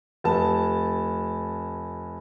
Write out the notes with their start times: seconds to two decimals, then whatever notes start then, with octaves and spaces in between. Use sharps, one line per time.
0.24 F1 A5